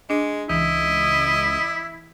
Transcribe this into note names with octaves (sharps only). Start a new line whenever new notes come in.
G#3 D4
C#2 E3 E4 D#5